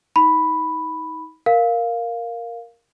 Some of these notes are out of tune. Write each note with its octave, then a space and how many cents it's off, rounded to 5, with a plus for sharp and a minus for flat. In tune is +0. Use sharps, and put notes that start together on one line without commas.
D#4 +30 B5 +0
A#4 +0 F5 +0